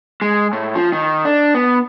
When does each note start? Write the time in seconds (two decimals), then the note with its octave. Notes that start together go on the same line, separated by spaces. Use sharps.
0.22 G#3
0.53 A2
0.75 F3
0.92 D#3
1.25 D4
1.55 B3